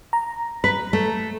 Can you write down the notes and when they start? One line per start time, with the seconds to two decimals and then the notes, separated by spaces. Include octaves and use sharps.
0.13 A#5
0.64 B4
0.93 A3